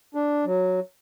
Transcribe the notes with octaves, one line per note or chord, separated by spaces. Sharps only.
D4
F#3